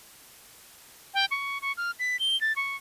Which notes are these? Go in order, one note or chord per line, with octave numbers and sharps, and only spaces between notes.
G5
C#6
C#6
F6
B6
G7
A6
C#6